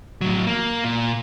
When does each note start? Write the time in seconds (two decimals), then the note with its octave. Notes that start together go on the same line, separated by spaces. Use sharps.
0.21 A2 F#3
0.47 A#3
0.84 A#2